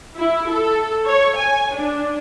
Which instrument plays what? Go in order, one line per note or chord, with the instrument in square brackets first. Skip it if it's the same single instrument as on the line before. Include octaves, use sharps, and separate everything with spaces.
[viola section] E4
A4
C#5
G#5
D4